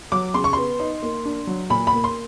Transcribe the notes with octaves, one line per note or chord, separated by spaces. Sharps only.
F#3 D6
C#3 C6
C#6
B3 C6
D#4
A#3
D4
F#3
A#2 B5
B5
A#3
C6